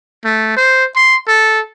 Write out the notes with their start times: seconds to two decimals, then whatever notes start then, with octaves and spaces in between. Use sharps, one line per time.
0.25 A3
0.57 C5
0.96 C6
1.28 A4